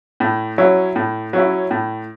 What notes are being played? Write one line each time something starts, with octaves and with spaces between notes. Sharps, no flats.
A2
F#3 C#4 E4
A2
F#3 C#4 E4
A2